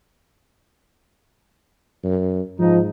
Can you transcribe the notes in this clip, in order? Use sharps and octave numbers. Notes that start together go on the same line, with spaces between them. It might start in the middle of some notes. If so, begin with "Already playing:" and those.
F#2
G#2 F3 D#4